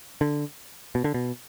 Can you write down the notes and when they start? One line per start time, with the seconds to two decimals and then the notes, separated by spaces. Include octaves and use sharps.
0.21 D3
0.95 B2
1.04 D3
1.14 B2